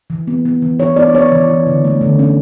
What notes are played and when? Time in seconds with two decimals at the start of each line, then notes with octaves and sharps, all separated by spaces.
0.10 E3
0.27 B3
0.45 B3
0.62 E3
0.79 E3 C#5
0.96 B3 D5
1.14 B3 C#5
1.32 E3
1.50 E3
1.67 D3
1.84 A3
2.01 D3
2.19 C#4